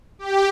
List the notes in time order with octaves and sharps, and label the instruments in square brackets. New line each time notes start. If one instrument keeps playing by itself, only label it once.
[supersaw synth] G4